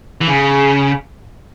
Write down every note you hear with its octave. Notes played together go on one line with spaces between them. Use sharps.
E3
C#3